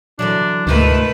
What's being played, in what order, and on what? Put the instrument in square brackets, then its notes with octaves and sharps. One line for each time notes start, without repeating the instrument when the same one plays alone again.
[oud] D3 E3 F#3 [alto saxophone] D4
[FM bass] D2 [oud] G#2 C3 F4 [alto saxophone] D#3 [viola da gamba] A3 B4